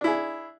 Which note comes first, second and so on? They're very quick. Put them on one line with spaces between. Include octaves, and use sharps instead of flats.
D4 E4 G#4